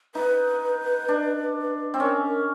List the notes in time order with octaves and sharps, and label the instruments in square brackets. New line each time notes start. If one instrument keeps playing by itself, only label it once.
[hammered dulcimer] D#4 [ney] B4
[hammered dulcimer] D4
C4
[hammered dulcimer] C#4 [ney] A#4
[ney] A#4